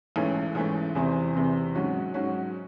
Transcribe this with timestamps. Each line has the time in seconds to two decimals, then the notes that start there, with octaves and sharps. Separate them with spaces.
0.16 A1 G#2 E3 A3 C#4
0.55 A1 G#2 E3 A3 C#4
0.95 E2 C3 E3 C4
1.35 E2 C3 E3 C4
1.75 G#2 F#3 C#4 F#4
2.14 G#2 F#3 C#4 F#4